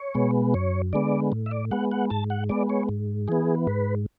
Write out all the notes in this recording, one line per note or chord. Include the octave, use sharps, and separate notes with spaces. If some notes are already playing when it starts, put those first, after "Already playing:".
Already playing: C#5
B2 G#3 B3
F#2 C#5
D3 G#3 B3 D5
A2
E5
D5
G#3 B3 F#5
F#5
G#2 A5
F#5
G#3 B3 D5
C#5
G#2
E3 B3 G#4
G#2 B4